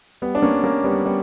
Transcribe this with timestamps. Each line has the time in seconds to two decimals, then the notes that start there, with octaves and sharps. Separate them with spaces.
0.22 G3 B3
0.35 D4
0.42 A#3 C#4
0.64 A#3 C#4
0.84 G3 B3
1.05 G3 B3